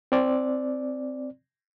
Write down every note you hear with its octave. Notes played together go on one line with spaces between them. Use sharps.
C4 D5